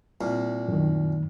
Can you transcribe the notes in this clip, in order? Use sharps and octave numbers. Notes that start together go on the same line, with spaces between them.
C2 A#2
F#2 D#3